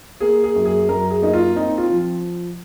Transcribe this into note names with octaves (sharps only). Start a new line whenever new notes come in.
A#3 G#4
G#4
F#2
G#4
F#2 A#4
G#4
A#3 D#4
F4
C4 D#4
F4
F3